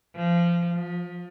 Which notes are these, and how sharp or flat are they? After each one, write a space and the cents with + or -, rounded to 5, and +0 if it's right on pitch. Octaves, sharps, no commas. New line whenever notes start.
F3 -20
F3 +25